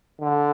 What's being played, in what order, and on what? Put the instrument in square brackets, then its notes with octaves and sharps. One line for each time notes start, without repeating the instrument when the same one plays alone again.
[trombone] D3